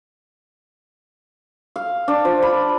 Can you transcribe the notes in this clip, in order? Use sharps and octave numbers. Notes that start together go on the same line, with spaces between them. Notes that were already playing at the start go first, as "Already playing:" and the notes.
F5
D4
F3
B5